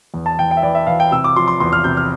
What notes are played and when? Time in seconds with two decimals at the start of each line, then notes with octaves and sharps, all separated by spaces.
0.14 E2
0.26 A5
0.38 E3 G5
0.51 G5
0.57 E5
0.63 E3 D5
0.75 E5
0.87 E3 F5
1.00 G5
1.11 C3 E6
1.24 D6
1.36 F3 C6
1.48 C6
1.60 E2 C6
1.72 F6
1.84 C3 G6
1.97 F6